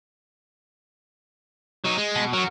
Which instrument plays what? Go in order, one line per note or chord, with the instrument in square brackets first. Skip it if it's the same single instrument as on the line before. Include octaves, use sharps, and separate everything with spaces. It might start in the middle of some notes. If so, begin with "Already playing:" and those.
[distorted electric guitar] F#3 D#4
G#3
[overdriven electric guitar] B2
[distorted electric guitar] F#3 [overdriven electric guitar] F#4 A#4